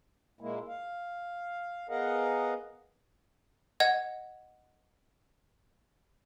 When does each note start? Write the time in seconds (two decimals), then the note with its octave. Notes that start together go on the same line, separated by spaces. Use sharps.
0.41 A#2 G#3 A#3 E4
0.68 F5
1.89 B3 G#4 A#4 D#5 F5 F#5
3.80 D#5 F#5 G#6